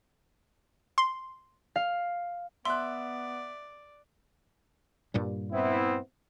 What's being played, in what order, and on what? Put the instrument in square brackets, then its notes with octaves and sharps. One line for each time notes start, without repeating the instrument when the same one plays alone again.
[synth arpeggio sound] C6
[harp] F5
[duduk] B3 [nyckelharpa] D5 [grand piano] E5 F#6 [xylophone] C6
[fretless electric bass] G2 A#2 G3
[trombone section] B3 C4 E4